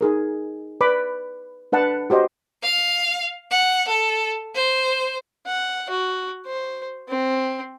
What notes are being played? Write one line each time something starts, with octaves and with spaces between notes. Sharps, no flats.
D#4 G#4 A#4
B4 D5 B5 D6
D4 B4 F#5 A5
F#4 G4 C5 D#5
F5
F#5
A4
C5
F#5
F#4
C5
C4